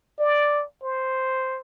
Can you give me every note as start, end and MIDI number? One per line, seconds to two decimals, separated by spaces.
0.19 0.64 74
0.83 1.60 72